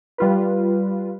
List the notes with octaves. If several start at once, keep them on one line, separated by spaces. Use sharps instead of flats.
G3 F4 B4